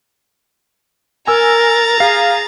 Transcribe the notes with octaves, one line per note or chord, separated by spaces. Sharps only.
A#4 G#5 A#5 E6 A6
G#4 F5 C7